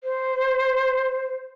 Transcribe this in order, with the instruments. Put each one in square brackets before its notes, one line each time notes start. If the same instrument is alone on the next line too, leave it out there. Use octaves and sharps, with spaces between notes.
[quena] C5